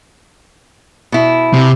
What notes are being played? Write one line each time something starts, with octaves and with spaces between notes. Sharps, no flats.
B2 E4
C3